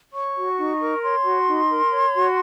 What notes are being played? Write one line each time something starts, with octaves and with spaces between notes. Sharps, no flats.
C#5 C#6
F#4
D#4
A#4
C#5 C6
F#4
D#4
A#4
C#5
F#4